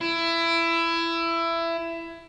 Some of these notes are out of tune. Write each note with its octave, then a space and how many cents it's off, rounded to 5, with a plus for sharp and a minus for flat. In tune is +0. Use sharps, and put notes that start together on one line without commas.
E4 +20